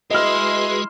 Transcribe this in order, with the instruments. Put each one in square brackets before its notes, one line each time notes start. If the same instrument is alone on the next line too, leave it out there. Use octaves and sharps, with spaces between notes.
[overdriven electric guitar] G#3 [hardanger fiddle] E4 C6 [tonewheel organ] F#4 G#4 B4 [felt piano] D#5 F6